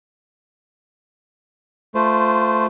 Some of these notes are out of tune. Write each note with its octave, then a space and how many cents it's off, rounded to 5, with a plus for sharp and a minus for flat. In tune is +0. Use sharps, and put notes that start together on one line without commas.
A3 +0 F4 +0 C5 -20